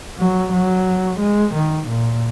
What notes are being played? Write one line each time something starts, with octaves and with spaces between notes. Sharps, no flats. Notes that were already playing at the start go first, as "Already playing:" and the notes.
F#3
F#3
G#3
D#3
A#2